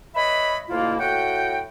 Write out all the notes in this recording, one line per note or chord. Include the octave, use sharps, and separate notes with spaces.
B4 C#5 D#5 E5 B5
D2 B2 A#3 E4 F4
A2 F#4 F#5 G5